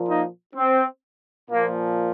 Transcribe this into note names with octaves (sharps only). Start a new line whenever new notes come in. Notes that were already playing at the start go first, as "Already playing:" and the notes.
Already playing: A#2 F3
A#3 D#4
C4
A#2 F3 A#3